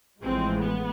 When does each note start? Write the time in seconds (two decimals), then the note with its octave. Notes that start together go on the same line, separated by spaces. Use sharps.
0.21 A1 A2 F3 G#3 C4
0.61 B3